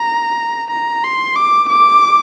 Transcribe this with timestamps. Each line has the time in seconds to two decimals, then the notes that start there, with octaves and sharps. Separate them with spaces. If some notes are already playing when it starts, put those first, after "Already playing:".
Already playing: A#5
0.71 A#5
1.04 C6
1.36 D6
1.69 D6